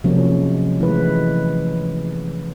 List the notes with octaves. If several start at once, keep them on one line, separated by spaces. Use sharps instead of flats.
C3 F3 F#3 G#3 A#3 C#4
E3 G#3 A3 B4